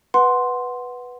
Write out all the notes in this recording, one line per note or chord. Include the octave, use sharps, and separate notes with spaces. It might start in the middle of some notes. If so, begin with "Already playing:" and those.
B4 F#5 C6